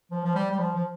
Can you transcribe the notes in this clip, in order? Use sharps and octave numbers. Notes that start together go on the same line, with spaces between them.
F3
F3
G3
G3
F3
F3